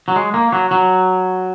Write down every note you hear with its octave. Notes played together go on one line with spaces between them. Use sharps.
F#3
G#3
A#3
F#3
F#3